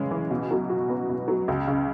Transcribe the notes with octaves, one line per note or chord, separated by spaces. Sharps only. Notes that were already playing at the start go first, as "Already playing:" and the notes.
Already playing: C#3 E3 G#3 C#4
E3
B2
F#3
F#4
B3
B2
F#3
C#2
C#3